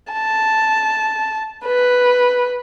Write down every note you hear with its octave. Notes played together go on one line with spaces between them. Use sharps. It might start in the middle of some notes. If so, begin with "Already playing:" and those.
A5
B4